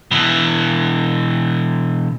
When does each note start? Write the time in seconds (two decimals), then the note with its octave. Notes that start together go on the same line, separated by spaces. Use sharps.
0.11 B2 E3